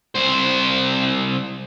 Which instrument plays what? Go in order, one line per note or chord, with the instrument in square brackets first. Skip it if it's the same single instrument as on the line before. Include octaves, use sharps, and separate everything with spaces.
[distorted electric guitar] C2 C5